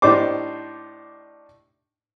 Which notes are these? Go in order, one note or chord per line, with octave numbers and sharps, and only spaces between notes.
A2 D4 D#4 G4 C5 D6